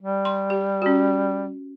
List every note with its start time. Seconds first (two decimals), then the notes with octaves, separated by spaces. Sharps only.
0.02 G3
0.25 C6
0.50 G4
0.82 C#4 F#4